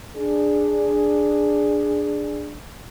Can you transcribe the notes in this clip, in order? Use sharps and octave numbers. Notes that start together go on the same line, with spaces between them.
D4 G#4